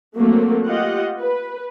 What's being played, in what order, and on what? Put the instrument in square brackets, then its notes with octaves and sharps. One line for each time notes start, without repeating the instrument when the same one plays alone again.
[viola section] F#3 A3 A#3 C4
F4 G4 D#5 F#5
B4